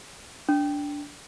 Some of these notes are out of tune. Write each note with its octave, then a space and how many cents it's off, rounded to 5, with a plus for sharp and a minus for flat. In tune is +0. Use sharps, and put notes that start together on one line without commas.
D4 -15